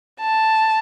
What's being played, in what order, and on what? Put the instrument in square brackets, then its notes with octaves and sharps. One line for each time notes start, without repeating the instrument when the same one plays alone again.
[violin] A5